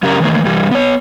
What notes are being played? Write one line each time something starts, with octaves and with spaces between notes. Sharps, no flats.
F#2 C#3 G4 A#4 A5 A#5
D#3 E3 A3 A#3
G2 E3 G3
B3 C#5